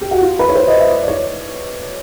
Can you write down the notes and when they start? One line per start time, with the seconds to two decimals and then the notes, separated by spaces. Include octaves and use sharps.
0.01 G4
0.11 F#4
0.22 F4
0.39 B4
0.49 C#5
0.55 C5
0.67 D#5
0.79 E5
0.90 D5
1.03 D5
1.08 C#5